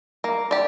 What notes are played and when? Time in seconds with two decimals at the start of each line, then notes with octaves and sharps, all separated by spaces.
0.24 A#3
0.51 G4 D5